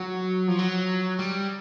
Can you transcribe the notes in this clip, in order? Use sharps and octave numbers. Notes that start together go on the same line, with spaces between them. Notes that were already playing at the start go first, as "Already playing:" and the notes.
Already playing: F#3
F3
F#3
G3